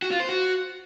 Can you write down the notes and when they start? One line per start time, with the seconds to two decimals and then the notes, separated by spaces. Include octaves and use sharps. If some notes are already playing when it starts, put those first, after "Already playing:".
0.02 F#4
0.11 F4
0.20 C5
0.29 F#4